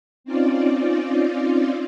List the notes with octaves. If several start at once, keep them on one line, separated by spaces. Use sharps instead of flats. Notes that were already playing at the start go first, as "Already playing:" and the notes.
C4 C#4 D#4 F4 D5